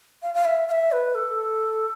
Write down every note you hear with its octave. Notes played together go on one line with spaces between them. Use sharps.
F5
F5
E5
F5
E5
B4
A4